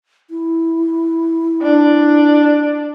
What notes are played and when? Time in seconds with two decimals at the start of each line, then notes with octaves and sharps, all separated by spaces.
0.30 E4
1.62 D4